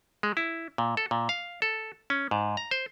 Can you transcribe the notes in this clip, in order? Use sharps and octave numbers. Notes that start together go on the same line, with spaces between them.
G#3
E4
A#2
A4
A#2
F5
A4
C#4
G#2
A#5
C5